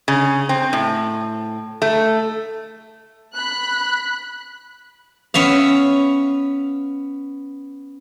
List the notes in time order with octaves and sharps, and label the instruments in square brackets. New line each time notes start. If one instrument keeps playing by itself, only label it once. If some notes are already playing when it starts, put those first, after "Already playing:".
[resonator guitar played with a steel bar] C#3
C4
A2
A3
[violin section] B5 F#6
[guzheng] B3 C#4 E5 F5